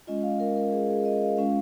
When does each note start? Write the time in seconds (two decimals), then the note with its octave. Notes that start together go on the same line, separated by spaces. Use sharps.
0.07 G#3 C#4 F4 D#5
0.23 F5
0.40 A#4
0.56 A#4
0.72 G#4
0.89 G#4
1.05 D#5
1.22 F5
1.37 G#3 C#4 F4 F5